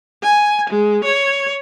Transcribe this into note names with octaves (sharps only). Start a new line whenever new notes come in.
G#5
G#3
C#5